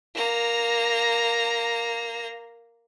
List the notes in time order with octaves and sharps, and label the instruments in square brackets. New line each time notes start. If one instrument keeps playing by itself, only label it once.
[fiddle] A#3 A#5